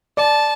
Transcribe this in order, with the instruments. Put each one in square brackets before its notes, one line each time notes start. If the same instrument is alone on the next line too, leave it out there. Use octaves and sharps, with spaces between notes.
[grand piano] D5 [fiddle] A5